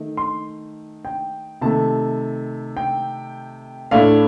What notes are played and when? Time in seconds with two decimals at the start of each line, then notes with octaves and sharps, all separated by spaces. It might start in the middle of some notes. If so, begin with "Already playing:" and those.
Already playing: D#3 A3
0.17 C6
1.05 G5
1.61 C3 D#3 A3 A5
2.77 G5
3.91 A2 A3 D4 F5